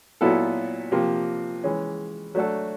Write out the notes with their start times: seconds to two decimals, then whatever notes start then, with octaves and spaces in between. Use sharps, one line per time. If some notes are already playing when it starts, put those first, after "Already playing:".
0.21 A#2 F#3 B3 E4 A4
0.92 C3 F3 A#3
1.64 E3 G#3 C#4
2.35 F#3 A3 D4 F#4 A4